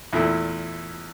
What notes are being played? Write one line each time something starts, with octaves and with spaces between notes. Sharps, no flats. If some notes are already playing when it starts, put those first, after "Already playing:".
E2 A#2 A3 E4